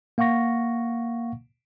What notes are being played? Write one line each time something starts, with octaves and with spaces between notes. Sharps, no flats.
A#3 F5 F#5 C#6 A#6